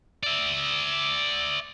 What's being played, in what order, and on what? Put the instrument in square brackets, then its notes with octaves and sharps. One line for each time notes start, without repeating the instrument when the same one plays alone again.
[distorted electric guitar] D5 E5